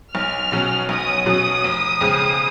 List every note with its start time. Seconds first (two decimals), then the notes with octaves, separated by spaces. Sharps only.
0.15 B1 F6
0.52 B2 F#3 C#4
0.89 B1 D#6
1.26 B2 F#3 C#4 D#6
1.64 F1
2.01 F2 C#3 G#3